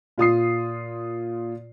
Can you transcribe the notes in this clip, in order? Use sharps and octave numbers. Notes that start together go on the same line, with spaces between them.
A#2 F4 D#6 C7